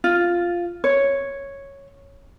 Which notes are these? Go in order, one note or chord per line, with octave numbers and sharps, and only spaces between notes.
F4
C#5